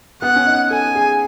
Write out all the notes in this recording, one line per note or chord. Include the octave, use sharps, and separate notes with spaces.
B3 F#5
C#4
D#4
A4 G#5
G#4